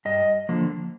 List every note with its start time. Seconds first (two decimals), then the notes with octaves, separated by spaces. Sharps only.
0.05 G2 D#5
0.49 D3 F3 A#3